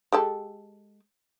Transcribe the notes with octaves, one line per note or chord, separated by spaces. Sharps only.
G#3 G4 A4